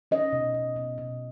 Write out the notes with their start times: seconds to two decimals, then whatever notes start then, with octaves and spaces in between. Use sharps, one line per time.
0.11 C#4 D#5
0.32 B2
0.54 B2
0.76 B2
0.98 B2